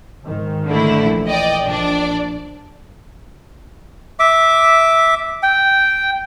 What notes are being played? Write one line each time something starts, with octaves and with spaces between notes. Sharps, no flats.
G#2 D#3
D3 A3 E4
A#1 E3
D5 D#5 G5
A#1 D4 D5
E5 D6
G5